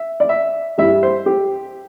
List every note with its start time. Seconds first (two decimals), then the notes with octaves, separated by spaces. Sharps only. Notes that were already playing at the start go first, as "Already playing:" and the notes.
Already playing: E5
0.20 D5
0.29 E5
0.78 G2 G3 E4 E5
1.03 C5
1.26 G4